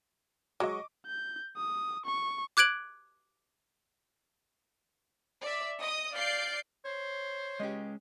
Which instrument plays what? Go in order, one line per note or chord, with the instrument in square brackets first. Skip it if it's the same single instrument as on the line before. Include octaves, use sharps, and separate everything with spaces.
[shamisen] F#3 G#3 [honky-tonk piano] D#5 C#6 D6
[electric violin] G6
D#6
C#6
[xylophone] D6 F#6 G#6 D7 F#7
[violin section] D5 E5
D#5 D#6
D5 F5 G6 C7 D7
[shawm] C5 [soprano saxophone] C#5
[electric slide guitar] G#3 C#4 [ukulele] G4 B4 D#5